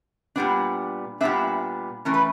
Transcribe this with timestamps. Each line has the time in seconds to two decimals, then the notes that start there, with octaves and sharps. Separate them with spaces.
0.36 A#2 G3 B3 D4
1.21 A#2 G3 B3 D4 E5
2.05 E3 A3 C#4 A#4
2.14 B4